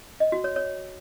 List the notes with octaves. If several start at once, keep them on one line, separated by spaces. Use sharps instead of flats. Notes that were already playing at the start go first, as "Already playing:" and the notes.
D#5
F#4
C#5
C#5